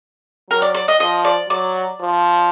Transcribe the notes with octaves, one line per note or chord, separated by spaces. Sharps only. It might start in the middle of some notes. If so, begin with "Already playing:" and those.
F#3 A#4
D5
D5
D#5
F3 D#5
D5
F#3 D5
F3